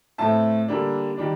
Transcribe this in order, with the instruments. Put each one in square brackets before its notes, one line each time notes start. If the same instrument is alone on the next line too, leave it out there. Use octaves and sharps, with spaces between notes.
[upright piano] A2 A3 C4 A5
D3 G3 A#3 D4
D#3 G3 D4